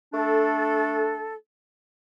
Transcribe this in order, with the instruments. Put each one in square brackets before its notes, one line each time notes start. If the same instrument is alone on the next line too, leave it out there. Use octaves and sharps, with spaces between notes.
[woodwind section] A3 D4 A4